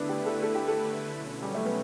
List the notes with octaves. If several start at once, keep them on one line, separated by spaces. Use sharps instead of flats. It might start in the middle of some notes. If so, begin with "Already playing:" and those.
Already playing: D3 A3 B3 D4 E4 B4
G4
A4
A4
G4
A4
B2 F#3 C#4
G3
A3
B3